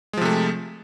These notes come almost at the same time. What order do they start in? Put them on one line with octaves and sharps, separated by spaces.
G#3 F3 C3 A3